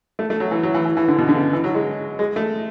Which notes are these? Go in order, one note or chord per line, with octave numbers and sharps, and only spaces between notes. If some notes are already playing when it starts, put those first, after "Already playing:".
A3
A3
F#3
E3
F#3
E3
E3
E3
D3
B2
D3
C#3
E3
F#3
G#3
G#3
A3